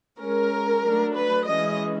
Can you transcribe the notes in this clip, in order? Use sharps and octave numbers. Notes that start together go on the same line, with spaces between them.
G#3 C#4 A#4
F#3 A3 D4
B4
E3 G#3 C#4 D#5